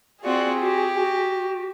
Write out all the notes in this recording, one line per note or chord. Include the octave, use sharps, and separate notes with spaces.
C4 F4 F#4 G#4 D5
F#4 G4
F#4